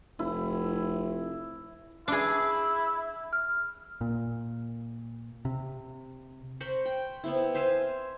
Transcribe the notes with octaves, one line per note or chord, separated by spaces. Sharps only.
F1 E4
D4 E4 G#4
F6
A#2
C3
A#4 C5 B5 C#6
G5
B3 C4 E4
C5 E5 F5 G#5